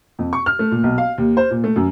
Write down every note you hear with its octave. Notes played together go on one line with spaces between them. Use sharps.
F2
C#6
F6
A3
A#2
B1
F5
D#2
C5
A#2
A3
F#2